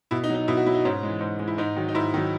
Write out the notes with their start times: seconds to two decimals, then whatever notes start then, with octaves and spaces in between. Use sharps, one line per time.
0.11 B2 E4
0.24 D#4
0.30 F#3
0.35 D#4
0.48 B2 E4
0.57 F#4
0.66 F#3 E4
0.75 D#4
0.85 G#2 C#4
1.03 E3 G#3
1.21 G#2
1.39 E3 G#3
1.48 E4
1.58 G#2 D#4
1.76 D#3 F#3
1.88 D#4
1.95 G#2 E4
2.14 D#3 F#3